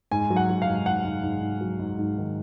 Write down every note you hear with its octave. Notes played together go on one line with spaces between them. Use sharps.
G#2 G#5
F#3
F#5
F#3
F5
G#2
G#2 F#5
G#2
G#2
G#2
F#3
G#2
G#2
D#3